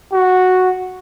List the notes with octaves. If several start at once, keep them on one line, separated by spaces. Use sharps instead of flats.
F#4